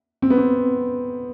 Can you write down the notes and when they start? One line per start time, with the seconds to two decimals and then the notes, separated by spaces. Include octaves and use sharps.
0.22 C4
0.30 B3
0.38 C4